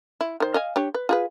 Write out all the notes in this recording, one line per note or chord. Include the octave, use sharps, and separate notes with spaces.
E4
D#3 C5
D#5 F5 G#5
D4 G4 C#5
B4
F4 G#4 B4